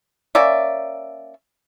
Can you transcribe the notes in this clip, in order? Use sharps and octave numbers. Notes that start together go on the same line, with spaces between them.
A#3 C#4 D5 E5